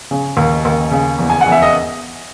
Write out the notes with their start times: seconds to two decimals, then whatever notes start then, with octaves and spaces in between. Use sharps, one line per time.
0.11 C#3
0.37 D#2
0.65 D#2
0.91 C#3
1.19 E2
1.30 G#5
1.41 F#5
1.46 E2
1.52 E5
1.62 D#5